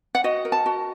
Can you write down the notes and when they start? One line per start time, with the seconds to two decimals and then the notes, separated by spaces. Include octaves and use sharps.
0.15 F#5
0.24 F#4 D#5
0.45 A#4
0.52 A5
0.66 F#4